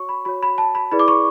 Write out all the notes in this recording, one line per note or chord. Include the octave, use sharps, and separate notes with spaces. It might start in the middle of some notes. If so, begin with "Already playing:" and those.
Already playing: F#4 C#5 C#6
B5
F#4 C#5 B5
B5
A5
B5
E4 G#4 B4 D5 B5
D6
C#6